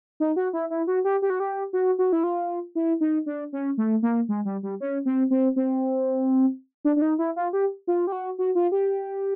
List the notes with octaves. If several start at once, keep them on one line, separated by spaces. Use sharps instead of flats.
D#4
F#4
E4
E4
F#4
G4
G4
F#4
G4
F#4
F#4
E4
F4
E4
D#4
D4
C#4
A3
A#3
G#3
G3
G3
C#4
C4
C4
C4
D4
D4
D#4
E4
F4
G4
F4
G4
F#4
F#4
F4
G4